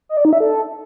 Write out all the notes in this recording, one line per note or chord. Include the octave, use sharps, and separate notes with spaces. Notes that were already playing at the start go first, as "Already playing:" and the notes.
D#5
D5
D#4
E5
A4